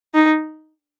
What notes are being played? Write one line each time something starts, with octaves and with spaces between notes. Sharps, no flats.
D#4